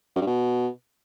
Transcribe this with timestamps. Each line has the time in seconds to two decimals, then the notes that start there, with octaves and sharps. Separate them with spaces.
0.16 F#2
0.21 G2
0.27 B2